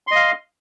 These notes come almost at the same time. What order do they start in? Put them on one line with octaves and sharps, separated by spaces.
C6 D#5 F5